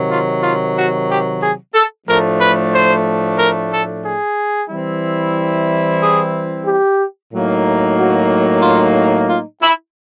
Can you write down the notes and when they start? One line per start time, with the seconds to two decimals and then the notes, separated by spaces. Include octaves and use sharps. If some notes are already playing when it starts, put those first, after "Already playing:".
Already playing: C3 D#3 F#3
0.10 F4
0.43 F4
0.76 F#4
1.09 G4
1.42 G#4
1.74 A4
2.07 A2 F3 A3 D4 A#4
2.40 B4
2.73 C5
3.38 A#4
3.71 A4
4.04 G#4
4.69 E3 G3 C4 E4
6.01 G#4
6.66 G4
7.32 A2 F#3 A#3 D#4
7.98 F#4
8.63 F4
9.28 F4
9.62 E4